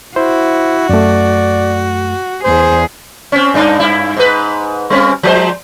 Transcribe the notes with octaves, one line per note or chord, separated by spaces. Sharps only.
E4 F#4 C5
F#2 A3 D5
E2 G#4 C5
C4 C#4
G2 D4 D#4
G2 E4
G#2 B4
G3 C4 C#4
F3 G#3 C5